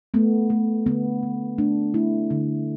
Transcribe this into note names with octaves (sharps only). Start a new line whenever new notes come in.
A3 B3
A3
D3 B3
D3
A3 D4
A3 E4
D3